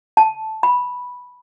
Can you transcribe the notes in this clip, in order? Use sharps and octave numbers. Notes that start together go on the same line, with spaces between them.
A5
B5